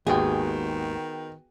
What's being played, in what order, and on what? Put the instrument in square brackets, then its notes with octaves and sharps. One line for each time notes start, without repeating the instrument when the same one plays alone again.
[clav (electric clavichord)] G#1 D#2 [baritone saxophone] D#3 [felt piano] B3 F#4 G5 [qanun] G#4